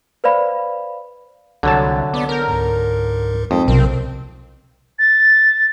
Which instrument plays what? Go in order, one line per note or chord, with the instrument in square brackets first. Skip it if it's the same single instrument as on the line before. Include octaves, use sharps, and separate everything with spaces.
[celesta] B4 C5 D5 F5 B5
[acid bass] C2 [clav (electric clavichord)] D3 F#3 A5
[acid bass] B3 [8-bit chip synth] D5 D6
[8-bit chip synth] B3 G6 [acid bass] A#4
[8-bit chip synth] C#2 G#2
[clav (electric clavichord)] F2 [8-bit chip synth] G#3 D#4 D#6
[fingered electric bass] B1 C3 [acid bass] C4 [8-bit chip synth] A#4
[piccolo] A6